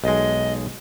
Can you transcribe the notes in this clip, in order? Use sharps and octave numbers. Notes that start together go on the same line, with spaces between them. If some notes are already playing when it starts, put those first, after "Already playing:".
B1 G#3 D#5